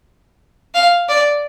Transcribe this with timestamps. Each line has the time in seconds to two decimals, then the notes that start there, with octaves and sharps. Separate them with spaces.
0.74 F5
1.09 D5